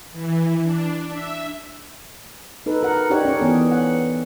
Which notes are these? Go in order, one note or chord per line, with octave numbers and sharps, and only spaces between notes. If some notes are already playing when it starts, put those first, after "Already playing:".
E3
D4
E5
D#4 A4 B4
A#4 F#5
D4 D#4 G4 C#5 F#5
C#4 C#5
E3 B3 G#4
F#5